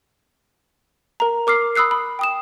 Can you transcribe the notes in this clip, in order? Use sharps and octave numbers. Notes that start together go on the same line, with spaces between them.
A#4 A#5
A#4 D6 F6 C7
B5 D#6 E6 F#6 C7
B5
G5 D#6 E7